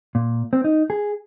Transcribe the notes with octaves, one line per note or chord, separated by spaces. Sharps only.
A#2
C4
D#4
G#4